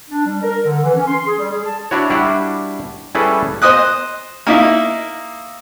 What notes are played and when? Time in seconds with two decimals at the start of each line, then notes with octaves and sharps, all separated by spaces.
0.09 D4
0.26 G3
0.42 A#4
0.65 D3
0.83 E3
0.95 C#4
1.08 C6
1.26 G#4
1.39 G3
1.52 G#4
1.64 A5
1.91 D4 E4 F#4 C#5
2.10 G3 D4 E4 F#4
3.15 G3 C#4 E4 G#4 A4 B4
3.62 C5 D#5 D#6 F#6
4.47 A#3 D#4 E4